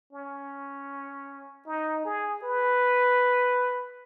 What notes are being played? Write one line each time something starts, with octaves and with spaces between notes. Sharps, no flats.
C#4
D#4
G#4
B4